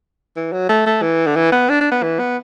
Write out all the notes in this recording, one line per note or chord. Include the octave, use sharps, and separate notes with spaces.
E3
F#3
A3
A3
E3
D3
E3
B3
D4
D4
B3
E3
B3